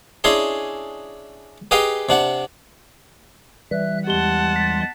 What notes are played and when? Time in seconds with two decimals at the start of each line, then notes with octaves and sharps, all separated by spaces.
0.24 C#4 D4 E4 G#4 D#5 C6
1.71 G4 G#4 B4 D#5 F5 G5
2.09 C3 D4 F#5
3.71 E3 G3 E5 F#6
4.07 E2 G#3 G4 F#5 A5 C6 G7
4.56 A6 B6